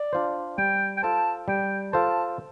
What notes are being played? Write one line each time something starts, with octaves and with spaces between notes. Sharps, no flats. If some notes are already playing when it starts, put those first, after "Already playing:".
Already playing: D5
D4 F4 C5
G3 G5
G5
F4 A4 C5 A5
G3 G5
F4 A4 C5 A5